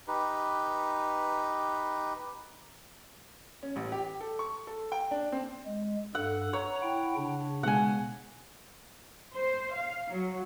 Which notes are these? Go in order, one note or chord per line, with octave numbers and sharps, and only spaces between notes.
D#4 G4 B4
C#4
A1
G4
A4
C#6
A4
G5
D4
C4
G#3
G2 A4 F#5
C#5 A#5
E4 F#5 G5
C#3 D4
B2 G#3 F#5 G#5
C5
F5
F#3